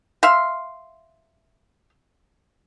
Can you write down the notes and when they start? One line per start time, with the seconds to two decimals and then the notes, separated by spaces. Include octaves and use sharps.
0.23 E5 F5 C6